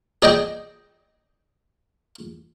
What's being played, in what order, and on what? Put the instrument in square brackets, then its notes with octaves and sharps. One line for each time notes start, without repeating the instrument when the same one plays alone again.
[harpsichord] G#4 D5 D#5 G5